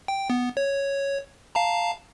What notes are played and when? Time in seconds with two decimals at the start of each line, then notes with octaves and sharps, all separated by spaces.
0.08 G5
0.30 B3
0.57 C#5
1.55 F5 A5 A#5